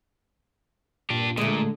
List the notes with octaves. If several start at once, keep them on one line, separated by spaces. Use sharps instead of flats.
A#2 D4 G4
A#2 D3 G#3 A3